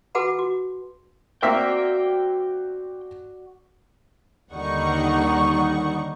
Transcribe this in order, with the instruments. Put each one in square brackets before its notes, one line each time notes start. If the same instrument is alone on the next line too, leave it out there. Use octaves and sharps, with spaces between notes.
[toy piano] F#4 G#4 B4 F#5 A5 B5
F#4
[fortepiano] A#3 C4 E5 [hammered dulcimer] F#4 D5 [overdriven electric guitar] G5
[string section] D#2 D3 G3 D#4 F#5 C#6